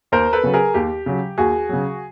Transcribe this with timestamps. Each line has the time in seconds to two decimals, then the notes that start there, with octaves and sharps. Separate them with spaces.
0.12 D#2 A#4 C5
0.33 A4 B4
0.43 C#3 F#3
0.54 G#4 A#4
0.74 D#2 G4
1.06 C#3 F#3
1.38 D#2 F#4 G#4
1.69 C#3 F#3